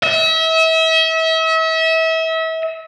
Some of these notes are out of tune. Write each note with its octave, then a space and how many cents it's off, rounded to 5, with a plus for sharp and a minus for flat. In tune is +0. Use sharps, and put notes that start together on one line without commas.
E5 -35